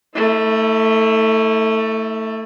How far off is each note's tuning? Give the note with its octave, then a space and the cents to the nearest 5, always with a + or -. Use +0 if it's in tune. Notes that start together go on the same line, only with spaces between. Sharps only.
A3 +15 E4 -30